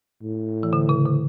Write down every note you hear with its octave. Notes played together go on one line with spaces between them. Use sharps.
A2
E3
D3
C#3
D3